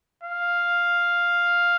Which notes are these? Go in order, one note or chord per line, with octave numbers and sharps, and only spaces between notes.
F5